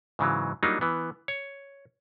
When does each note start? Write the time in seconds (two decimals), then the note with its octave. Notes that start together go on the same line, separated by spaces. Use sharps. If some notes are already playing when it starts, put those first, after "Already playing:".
0.19 G#2 C#3 E3 F#3
0.63 F#3 G3 A#3 D4 D#4 F4
0.81 E3 B3
1.28 C#5